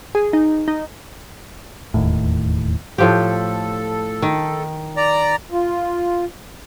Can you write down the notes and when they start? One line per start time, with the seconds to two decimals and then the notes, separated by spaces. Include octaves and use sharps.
0.15 G#4
0.33 D#4
0.68 D#4
1.94 E1 D#2 A2
2.98 A2 F3 G4 A4
4.22 D#3
4.97 D5 A#5
5.51 F4